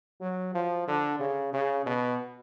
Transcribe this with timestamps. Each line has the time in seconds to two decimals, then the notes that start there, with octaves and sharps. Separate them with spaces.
0.21 F#3
0.54 F3
0.88 D3
1.20 C#3
1.53 C#3
1.86 B2